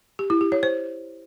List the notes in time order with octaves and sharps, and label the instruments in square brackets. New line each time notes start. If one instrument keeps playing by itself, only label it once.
[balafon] G4
E4
G4
C#5
C5